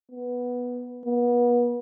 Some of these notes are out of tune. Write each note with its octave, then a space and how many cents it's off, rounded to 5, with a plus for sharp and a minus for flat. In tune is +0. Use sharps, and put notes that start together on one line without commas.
B3 -5
B3 -35